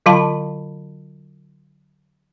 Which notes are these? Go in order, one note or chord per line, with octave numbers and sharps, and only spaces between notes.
D3 F#3 F4 F5 A5 B5